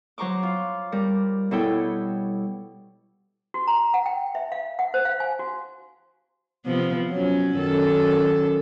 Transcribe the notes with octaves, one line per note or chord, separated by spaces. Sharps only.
F#3 C5 A#5 C#6 D6
F4
G3 A#4
B2 G3 E4 A4 C#5 G5
F#4
A#5
F#5
G5
E5
F5
F#5
C5
F5
G#5
F#4
C3 F3 B3
F#3 C#4
F#2 D#3 A4